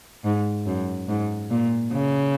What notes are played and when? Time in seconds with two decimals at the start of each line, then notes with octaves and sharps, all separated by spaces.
0.25 G#2
0.67 F#2
1.08 G#2
1.50 A#2
1.92 C#3